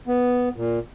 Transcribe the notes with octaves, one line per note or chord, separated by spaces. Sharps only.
B3
A#2